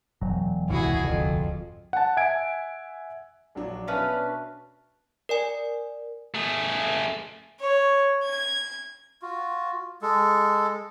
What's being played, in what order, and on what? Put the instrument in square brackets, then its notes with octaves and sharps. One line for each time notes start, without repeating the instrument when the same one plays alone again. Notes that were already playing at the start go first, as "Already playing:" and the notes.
[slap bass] E1 [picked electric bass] F#3
[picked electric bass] D#1 C2 G#2 [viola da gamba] E4 F#4 G#4
[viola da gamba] F2 [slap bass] D3
[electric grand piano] F#5 G#5 A5
E5 F#5 G#5 G#6 D7
[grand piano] A#1 F#3 D4
[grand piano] B2 D4 [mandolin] C#4 B4 F5 [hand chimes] E5 A5 F#6
[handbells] A#4 D5 G#5
[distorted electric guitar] A3 G#4
[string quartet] C#5
G#6
[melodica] F4 F#4
G#3 A4